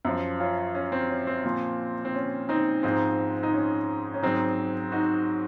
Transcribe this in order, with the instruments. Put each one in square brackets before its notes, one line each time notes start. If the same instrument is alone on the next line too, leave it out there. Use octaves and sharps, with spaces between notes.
[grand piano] F#2 F3
C#4 F4
C#4
C4
C#4
C4
A#2 F3
C4
C#4
C4 D#4
G#2 F3 C4 D#4
D#4
C#4
C#4
G#2 F#3 C4 D#4
D#4 F#4